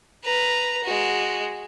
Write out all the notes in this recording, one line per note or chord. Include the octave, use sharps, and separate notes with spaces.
B4 A#5
G#3 F#4